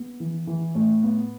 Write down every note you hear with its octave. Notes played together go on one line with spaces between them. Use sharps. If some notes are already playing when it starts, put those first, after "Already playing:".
Already playing: B3
E3
E3
A2
B3